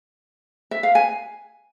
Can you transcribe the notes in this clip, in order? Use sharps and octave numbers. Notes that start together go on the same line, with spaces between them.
E5
F5
G#5